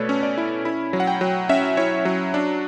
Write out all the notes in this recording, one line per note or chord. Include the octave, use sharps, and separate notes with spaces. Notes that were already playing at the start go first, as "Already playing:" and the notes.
Already playing: B2 A3 A4 B4 C#5 D5
C#4
D5
E4
E4 B5
F#3
F#5
G5
F#3
C#4 E5
E4 C#5
F#3
D4